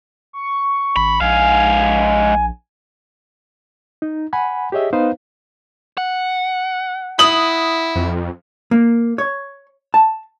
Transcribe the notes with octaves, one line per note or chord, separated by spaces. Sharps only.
C#6
G#1 B5
A#1 G#2 F5 G#5
D#4
F#5 G#5 B5
G4 G#4 C#5 D#5 E5
B3 D#4 B4 C5 F5
F#5
E4 D#6 F#7
F2
A#3
C#5
A5